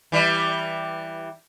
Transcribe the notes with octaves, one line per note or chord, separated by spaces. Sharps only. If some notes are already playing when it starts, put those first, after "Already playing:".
E3 G3